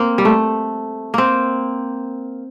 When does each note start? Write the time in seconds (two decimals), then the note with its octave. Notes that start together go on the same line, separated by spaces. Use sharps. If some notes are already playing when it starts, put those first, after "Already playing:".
Already playing: A#3 C4
0.18 G3
0.25 A3
1.14 A#3 C4